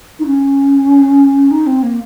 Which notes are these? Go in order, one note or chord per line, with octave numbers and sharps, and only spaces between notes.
D#4
C#4
D#4
C4
A#3